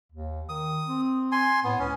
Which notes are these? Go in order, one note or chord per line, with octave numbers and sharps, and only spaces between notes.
D#2
D#3 D#6
C4
G#5 C6
A2 B3
C#2 C#4